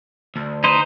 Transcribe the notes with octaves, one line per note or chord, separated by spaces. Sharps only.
D2
D#4 B4 C5